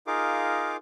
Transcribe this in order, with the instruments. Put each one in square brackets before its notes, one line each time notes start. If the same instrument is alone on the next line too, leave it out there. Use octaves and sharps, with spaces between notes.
[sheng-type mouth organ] D#4 F4 G#4 A#4 F5 D6